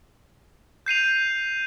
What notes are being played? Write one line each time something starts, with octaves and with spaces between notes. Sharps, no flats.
G6 C7 D#7 F7